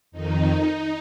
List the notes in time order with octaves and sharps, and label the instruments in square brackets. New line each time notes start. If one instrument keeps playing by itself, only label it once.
[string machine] F2 D#3 D#4